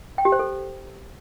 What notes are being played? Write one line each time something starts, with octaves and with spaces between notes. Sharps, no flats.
G5
G4
C5
A4